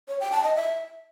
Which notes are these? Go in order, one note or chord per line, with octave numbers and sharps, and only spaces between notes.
C#5
G5
A5
D#5
E5